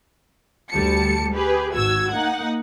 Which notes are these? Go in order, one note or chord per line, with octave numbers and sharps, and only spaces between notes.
D2 G3 A5 C#7
G4 G#4 B4
G#1 F#4 E6 G#6
A#3 D#4 F#5